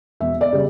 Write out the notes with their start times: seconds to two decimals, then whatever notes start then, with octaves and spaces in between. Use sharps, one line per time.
0.20 E1 E5
0.41 D5
0.53 C#3 G3